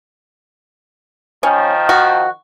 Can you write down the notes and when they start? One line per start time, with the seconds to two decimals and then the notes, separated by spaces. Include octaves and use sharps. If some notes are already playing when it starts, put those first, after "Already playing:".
1.43 D#3 F3 C#4
1.89 F#4